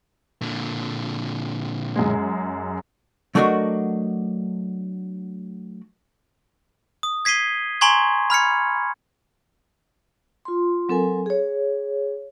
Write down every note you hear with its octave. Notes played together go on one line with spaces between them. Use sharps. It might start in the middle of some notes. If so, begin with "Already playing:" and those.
A#2 D3
F#2 G#3
F#3 A3 D4 F#4 A#4 D#5
D#6
G#6 B6 C7 D#7 G7
G#5 A#5 C6 C#6 G#6
B5 F6 G#6 C#7
F4 C6
F#3 C4 A4 A#4 G#5
G#4 C#5